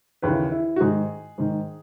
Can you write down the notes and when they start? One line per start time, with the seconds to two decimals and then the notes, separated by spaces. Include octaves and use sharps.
0.22 D#2 C#3 E3 B4
0.52 E4
0.76 F#4
0.80 G#2 D#3 G#4
1.38 G#2 D#3